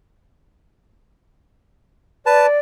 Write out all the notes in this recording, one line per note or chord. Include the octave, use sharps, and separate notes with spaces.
B4 D5 A5